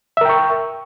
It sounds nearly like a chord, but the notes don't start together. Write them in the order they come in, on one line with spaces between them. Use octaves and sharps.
E5 A#4 G5 C#6